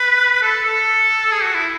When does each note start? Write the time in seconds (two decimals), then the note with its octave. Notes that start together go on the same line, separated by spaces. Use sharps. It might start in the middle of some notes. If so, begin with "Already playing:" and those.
Already playing: B4
0.42 A4
0.64 A4
1.32 G#4
1.43 F#4
1.54 E4